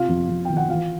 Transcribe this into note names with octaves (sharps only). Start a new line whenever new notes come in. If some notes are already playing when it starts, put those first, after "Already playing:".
Already playing: C3 F4 F5
F2
F2
D#3 G5
F#5
E3 F4 F5